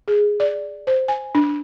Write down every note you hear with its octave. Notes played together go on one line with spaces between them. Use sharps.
G#4
D5
C5
G#5
D4